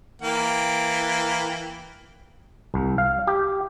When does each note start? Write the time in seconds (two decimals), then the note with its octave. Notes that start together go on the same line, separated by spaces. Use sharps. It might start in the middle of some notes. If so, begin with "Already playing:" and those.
0.22 E3 A#3 G5
2.74 C2
2.98 F5
3.27 G4